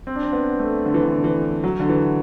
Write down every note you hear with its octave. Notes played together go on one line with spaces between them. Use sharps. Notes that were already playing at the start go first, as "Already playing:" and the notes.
C4
D4
C4
B3
A3
D3
E3
D3
E3
F#3
D3
E3